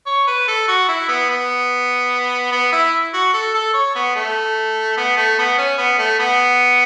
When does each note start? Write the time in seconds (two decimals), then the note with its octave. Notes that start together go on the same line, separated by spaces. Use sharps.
0.06 C#5
0.27 B4
0.48 A4
0.68 F#4
0.88 E4
1.08 B3
1.30 B3
2.52 B3
2.72 E4
3.14 F#4
3.33 A4
3.54 A4
3.74 C#5
3.95 B3
4.16 A3
4.97 B3
5.17 A3
5.38 B3
5.58 C#4
5.78 B3
5.99 A3
6.19 B3